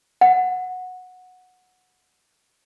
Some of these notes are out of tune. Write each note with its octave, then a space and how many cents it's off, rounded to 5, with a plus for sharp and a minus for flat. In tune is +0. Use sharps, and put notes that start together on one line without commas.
F#5 -10